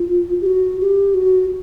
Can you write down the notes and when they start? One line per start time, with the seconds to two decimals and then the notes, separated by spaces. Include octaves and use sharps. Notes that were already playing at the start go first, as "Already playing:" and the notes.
Already playing: F4
0.41 G4
0.46 F#4
0.81 G4
1.14 F#4